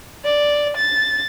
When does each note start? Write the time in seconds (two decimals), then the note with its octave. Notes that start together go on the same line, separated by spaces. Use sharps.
0.25 D5
0.77 A6